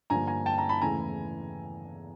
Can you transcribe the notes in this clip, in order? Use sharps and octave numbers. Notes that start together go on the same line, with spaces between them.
G2 D3 F3 A#3 G#5 A#5
G#5 A#5
G5 A5
A#5
A5 B5
E2 C#3 E3 A3 G#5 A#5